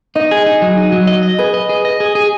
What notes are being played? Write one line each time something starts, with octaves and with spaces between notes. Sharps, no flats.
D#4 D#5
G#4
D#4
F#3
D#4
F#3
D#5
D#5
G#4 B4
D#5
G#4
D#5
G#4
G#4